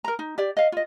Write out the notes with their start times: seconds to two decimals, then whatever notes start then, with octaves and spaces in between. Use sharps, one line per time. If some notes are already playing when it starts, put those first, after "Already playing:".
0.04 A#4 A#5
0.19 D#4
0.38 G4 D5
0.57 D#5 F5
0.72 F4 D#5